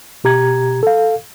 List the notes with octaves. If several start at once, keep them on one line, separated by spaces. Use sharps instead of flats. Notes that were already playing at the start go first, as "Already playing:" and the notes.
B2 G4 A#5 G#6
A4 F5